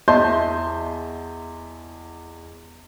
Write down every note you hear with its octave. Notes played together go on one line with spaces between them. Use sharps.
E2 D#5 E5 A5 C6 G6